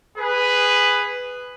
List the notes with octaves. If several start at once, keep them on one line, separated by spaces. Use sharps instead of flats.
G#4 B4